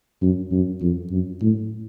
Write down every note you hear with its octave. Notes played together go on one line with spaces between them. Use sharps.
F#2
F#2
F2
F#2
A2